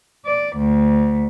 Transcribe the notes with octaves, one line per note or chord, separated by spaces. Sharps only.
D5
D2